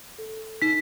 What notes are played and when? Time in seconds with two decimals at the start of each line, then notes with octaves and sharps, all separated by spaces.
0.19 A4
0.62 D#4 B6